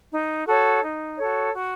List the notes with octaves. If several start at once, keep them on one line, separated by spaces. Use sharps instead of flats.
D#4
F#4 A4 C#5
D#4
F#4 A4 C#5
F#4